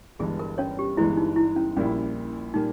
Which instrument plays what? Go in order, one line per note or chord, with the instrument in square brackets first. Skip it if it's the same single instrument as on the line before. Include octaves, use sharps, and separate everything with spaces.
[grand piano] G1 G2 E3 G#3 [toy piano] G#4
[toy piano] A#4
C#4 C#5
G4
[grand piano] G1 G2 E3 G#3 [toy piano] E4
[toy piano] D#4
E4
C#4
[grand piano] A#1 A#2 G3 A#3 E4 [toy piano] C#4
[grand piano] A#2 G3 A#3 [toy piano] D#4